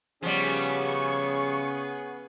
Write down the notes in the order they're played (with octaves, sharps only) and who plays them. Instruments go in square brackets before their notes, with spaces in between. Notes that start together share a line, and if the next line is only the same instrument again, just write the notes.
[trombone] C#3 [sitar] F3 G3 [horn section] B3 C#4 G#4 [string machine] C#6